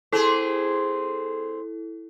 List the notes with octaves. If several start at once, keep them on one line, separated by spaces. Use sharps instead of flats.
C4 E4 G#4 A4